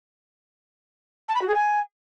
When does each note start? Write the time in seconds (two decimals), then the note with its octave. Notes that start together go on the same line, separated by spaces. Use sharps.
1.28 A5
1.35 B5
1.41 F#4
1.48 G#4
1.54 G#5